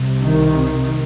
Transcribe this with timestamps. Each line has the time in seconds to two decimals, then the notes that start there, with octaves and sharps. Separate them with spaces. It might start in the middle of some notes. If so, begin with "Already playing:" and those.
Already playing: C2 C3
0.22 D#3